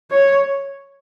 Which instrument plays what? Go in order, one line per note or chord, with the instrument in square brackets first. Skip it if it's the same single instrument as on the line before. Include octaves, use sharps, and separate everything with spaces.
[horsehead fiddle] C#5